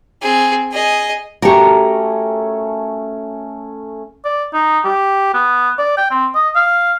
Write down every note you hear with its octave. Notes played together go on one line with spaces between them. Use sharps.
C4 G#4
G#4 D#5
A3 C#4 F#4 G4 A4 A#4 C#6
D5
D#4
G4
B3
D5
G5
C4
D#5
F5